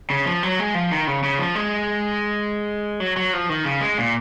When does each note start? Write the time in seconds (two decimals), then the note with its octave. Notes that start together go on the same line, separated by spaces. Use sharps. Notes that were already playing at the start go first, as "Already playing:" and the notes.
0.10 C#3
0.26 F3
0.43 F#3
0.59 G#3
0.75 F3
0.91 D#3
1.07 C#3
1.23 C#3
1.39 F3
1.55 G#3
3.00 F#3
3.17 F#3
3.33 F3
3.49 D#3
3.65 C#3
3.81 G#3
3.98 A#2